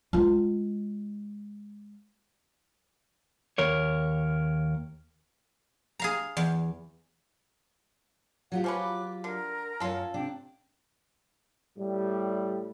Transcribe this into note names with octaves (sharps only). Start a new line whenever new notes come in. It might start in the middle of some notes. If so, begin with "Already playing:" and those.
G#3 F4
D#2 A#4 C#5
G#4 F5 A#5
E2
F#3 F4 G4 F#5
F3 C#4 B4 D6
D3 A#4
F#2 F4 A4 C#5
C3 D4 G5
A2 G3